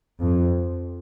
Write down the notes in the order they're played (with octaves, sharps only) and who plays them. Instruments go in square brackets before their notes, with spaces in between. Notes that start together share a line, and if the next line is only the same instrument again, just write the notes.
[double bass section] F2